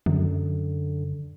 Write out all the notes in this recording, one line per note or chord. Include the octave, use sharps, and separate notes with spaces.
F#2 D3